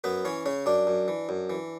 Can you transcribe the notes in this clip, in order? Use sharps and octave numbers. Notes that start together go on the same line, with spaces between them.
F#2 B3 B4
E3 C#4 C#5
C#3 C#4 C#5
F#2 D4 D5
F#2
E3
F#2
E3